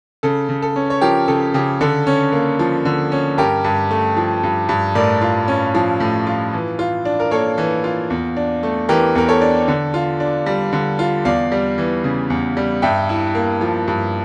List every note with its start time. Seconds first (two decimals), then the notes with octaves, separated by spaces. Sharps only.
0.23 C#3 A4
0.49 C#3
0.62 A4
0.76 C#4
0.90 C#5
1.01 F3 G4 A#4
1.28 C#3 A4
1.54 C#3 G4
1.81 D3 A4
2.07 C#4
2.33 A#3
2.59 F3
2.85 D3
3.12 C#4
3.38 G2 G4 A#4
3.64 G2
3.91 A3
4.17 F3
4.43 G2
4.69 G2
4.95 A2 A#4 D5
5.21 F4
5.48 C#4
5.75 F3
6.00 A2
6.27 F4
6.53 E3
6.79 F4
7.05 D4
7.20 A#4
7.31 A#3 A4 C#5
7.58 E3
7.84 F4
8.10 E2
8.37 D4
8.63 A3
8.89 E3 G4 A#4
9.15 E2 A#4
9.29 A4 C#5
9.42 D4
9.68 D3
9.94 F4
10.20 D4
10.46 G3
10.73 D3
10.99 F4
11.25 E2 D5 F5
11.52 G3
11.78 E3
12.04 C#3
12.30 E2
12.57 G3
12.82 G2 E5 G5
13.09 E4
13.35 A#3
13.61 F3
13.88 G2